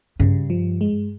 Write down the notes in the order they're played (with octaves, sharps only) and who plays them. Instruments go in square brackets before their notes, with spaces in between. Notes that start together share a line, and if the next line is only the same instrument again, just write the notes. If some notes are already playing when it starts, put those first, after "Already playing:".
[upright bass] G2 [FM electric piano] C#3
[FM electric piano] F3
G#3